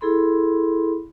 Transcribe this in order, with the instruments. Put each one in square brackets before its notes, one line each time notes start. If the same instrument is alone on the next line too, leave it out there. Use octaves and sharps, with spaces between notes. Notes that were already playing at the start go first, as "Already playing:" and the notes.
[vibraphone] E4 G#4 A4 B5 C6